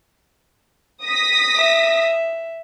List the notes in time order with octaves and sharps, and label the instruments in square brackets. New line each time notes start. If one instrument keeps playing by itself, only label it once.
[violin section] D#6 A#6 B6
[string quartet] E5